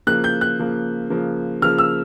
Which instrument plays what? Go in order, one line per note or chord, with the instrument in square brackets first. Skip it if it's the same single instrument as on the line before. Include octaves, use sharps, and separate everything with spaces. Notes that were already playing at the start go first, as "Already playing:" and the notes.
[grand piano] C#3 F3 A#3 F#6
G6
F#6
C#3 F3 A#3
C#3 F3 A#3
C#3 F3 A#3 F6
E6